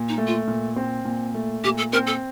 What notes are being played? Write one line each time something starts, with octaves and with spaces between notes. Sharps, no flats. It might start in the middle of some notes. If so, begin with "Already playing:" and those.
Already playing: A#2
D#4
A3
F4
A#2
C4
A#2
A3
A#2 G4
A4
C4 A#4
A4